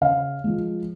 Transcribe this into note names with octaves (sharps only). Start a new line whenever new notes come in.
C#3 F5
F3 G#3